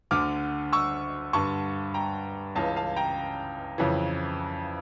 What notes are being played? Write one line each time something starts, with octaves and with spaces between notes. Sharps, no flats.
D2 D3 D6 F6
C#6 E6
G2 D3 A5 C#6
G5 A#5
C#2 C#3 E3 F5 A5
F5 A5
G5 A#5
F2 C#3 E3